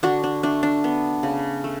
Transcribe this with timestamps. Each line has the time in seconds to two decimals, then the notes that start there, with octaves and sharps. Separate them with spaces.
0.03 D3 D4 F#4
0.24 D4
0.43 A3 D4
0.63 D4
0.84 B3
1.23 C#3
1.64 A3